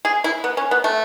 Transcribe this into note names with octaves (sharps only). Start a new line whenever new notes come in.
G#4
E4
B3
C#4
B3
A3